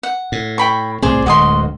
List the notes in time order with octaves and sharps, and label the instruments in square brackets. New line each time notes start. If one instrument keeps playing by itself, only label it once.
[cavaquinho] F#5
[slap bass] A2
[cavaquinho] G5 B5 C#6
[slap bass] C2 A2 C4 [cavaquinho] G#4 C5 D5
[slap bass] D1 D2 G#3 [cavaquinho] F#4 D#5 C6